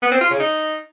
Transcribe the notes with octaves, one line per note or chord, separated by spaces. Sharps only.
B3
C4
F4
C#3
D#4